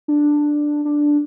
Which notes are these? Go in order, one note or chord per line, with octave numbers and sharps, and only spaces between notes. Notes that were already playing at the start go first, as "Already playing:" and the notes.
D4
D4